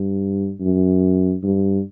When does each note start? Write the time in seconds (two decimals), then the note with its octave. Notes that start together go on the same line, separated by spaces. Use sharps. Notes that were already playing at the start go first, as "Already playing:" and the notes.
Already playing: G2
0.60 F#2
1.43 G2